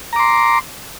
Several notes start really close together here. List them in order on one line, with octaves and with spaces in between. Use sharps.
A#5 D6 C6